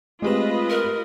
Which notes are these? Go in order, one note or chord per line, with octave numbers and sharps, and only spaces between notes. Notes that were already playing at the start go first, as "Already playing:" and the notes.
G#3 A3 C4 F4 G4 B4 D#5 E7
A#4